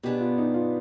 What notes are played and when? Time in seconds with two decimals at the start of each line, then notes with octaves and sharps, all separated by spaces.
0.03 B2 B3 D4 G4 G#4
0.20 F4
0.38 D#4
0.54 F4